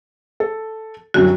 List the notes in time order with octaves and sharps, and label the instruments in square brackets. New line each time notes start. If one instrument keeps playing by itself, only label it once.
[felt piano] A4
[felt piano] C2 F#2 D3 [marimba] F#4